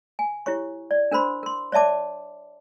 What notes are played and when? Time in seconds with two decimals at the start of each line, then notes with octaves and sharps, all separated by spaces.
0.19 G#5
0.46 E4 G4 C#5 C#6
0.91 D5
1.11 D4 A#4 C5 B5 C6
1.43 A#4 C6
1.72 C#5 D5 E5 A5 D6